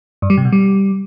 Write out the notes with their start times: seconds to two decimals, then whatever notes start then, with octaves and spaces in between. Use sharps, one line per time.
0.22 G2
0.30 G3
0.37 C3
0.45 B2
0.52 G3